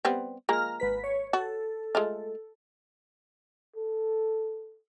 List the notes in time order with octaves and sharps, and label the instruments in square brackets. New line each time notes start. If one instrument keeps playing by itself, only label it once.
[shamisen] G3 B3 C4
[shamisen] F3 G#3 A#3 [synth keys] A#5 F6
[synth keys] G#1 B4 B6
C#5
[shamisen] F#4 [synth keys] A4
[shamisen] G#3 A3 F4
[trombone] A4